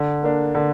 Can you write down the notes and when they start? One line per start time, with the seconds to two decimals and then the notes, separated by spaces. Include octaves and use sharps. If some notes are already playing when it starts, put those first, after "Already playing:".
Already playing: D3
0.23 A#3 D4
0.55 D3